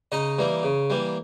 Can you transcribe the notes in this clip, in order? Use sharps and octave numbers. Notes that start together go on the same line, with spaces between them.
C#3 D#4 D#5
E3 G3 A#3
C#3
E3 G3 A#3